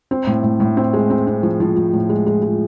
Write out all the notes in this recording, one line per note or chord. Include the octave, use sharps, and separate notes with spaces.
C4
A2
A2
A2
C4
G#3
C4
C4
F3
F3
F3
A2
G#3
G#3
G#3